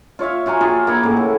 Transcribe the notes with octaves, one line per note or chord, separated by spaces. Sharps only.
F4 C#5 E5 F5
F4 F#4 G#5 A#5
F4 G4 G#4
A#3 E4 F#5
A2 C#3
E4